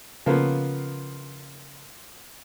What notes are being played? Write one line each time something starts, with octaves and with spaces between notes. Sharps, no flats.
C#3 F3 A#3 B3